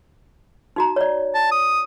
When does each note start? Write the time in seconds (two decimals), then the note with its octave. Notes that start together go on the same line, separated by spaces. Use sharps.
0.76 D#4 F#4 A#5
0.96 C#5 D5
1.34 A5
1.51 D#6